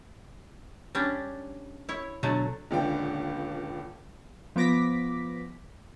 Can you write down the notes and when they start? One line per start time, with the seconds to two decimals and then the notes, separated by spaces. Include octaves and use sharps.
0.95 G3 C#4 D4
1.89 E4 C#5
2.23 B2 D3 F#3 A3
2.71 D#1 C#2 D3 G5
4.56 F3 B3 D6 A#6 B6